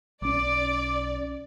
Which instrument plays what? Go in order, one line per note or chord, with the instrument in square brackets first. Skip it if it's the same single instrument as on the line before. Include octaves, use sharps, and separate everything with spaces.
[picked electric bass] B1 C#4 [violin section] D5 [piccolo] D6